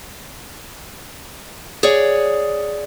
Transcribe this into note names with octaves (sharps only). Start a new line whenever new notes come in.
G#4 C#5 D5 F#5